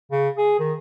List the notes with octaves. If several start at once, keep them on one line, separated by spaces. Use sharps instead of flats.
C#3
G#4
D#3